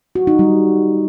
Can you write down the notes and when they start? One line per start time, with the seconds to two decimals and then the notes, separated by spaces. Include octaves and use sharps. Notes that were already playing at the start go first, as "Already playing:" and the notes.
0.15 F#4
0.27 D#4
0.39 G3